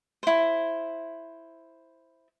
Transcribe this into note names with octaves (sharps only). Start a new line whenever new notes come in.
E4 C5